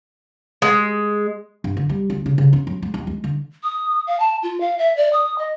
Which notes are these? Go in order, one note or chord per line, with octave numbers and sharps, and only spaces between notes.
G#3
G2
D3
G3
D2
C#3
C#3
C#4
F#3
G#3
D#2
G#3
D3
D#6
F5
A5
F4
F5
E5
D5
D#6
D#5